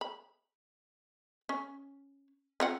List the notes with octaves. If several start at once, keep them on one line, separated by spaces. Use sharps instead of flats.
B5
C#4
C4 F4 F#5